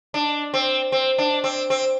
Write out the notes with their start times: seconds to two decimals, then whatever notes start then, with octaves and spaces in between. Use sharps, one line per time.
0.14 D4
0.54 C4
0.92 C4
1.18 D4
1.44 C4
1.70 C4